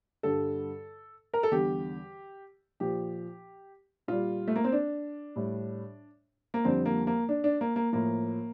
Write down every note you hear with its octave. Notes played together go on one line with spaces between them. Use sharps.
G2 D3 G3 A4
A#4
A4
E2 D3 G3 G4
A#2 F3 G4
A#2 G3 F4
A3
A#3
C4
D4
A2 G3
A#3
F2 D3 G3 C4
A#3
A#3
D4
D4
A#3
A#3
A2 F3 A#3